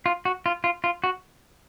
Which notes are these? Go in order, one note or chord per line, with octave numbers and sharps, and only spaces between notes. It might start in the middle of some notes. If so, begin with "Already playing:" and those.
F4
F#4
F4
F4
F4
F#4